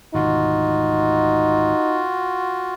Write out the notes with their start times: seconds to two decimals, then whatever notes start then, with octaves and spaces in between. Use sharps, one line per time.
0.14 G#1 D2 B2 D#4 F4 F#4